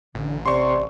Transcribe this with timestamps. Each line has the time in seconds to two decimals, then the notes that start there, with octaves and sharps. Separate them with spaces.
0.15 A1 D3
0.46 C3 D5 C6 C#6